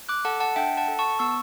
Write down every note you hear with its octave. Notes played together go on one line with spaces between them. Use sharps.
D6 F#6
A4 F#5 A5
F#5 A5
D4 E5 G5
F#5 A5
A4
A5 C#6
B3 C#6 E6